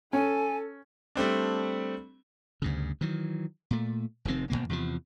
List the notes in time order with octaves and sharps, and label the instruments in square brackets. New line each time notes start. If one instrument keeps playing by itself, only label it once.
[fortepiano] C#4 [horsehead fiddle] A4 [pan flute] G#5
[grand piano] G3 A3 C4 D4
[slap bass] D2 G2 C#3
D#3 E3 F#3
A#2 A3
F1 C3 D#3 C4
G#1 F#2 B2 A#3
E2 C3 D#3 F3